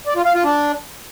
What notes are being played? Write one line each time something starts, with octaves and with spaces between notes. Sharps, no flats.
D5
F4
F5
F4
D4